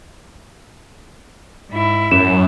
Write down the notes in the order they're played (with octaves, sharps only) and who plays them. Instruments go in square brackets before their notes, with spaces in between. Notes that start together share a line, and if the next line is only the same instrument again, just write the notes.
[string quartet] G#2 E4
[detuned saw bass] F#2 [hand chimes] C#4 [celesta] E7